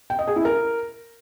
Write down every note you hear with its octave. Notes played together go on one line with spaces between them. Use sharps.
G5
D#5
G#4
E4
A#4